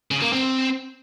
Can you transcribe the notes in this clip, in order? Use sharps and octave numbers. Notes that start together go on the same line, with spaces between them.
C#3
A#3
C4